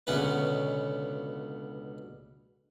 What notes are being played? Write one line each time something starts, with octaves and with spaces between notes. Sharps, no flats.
C#2 B2 D3 C#4 F#4 B4